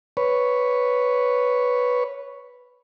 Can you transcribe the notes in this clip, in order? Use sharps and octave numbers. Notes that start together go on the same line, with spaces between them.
B4 C#5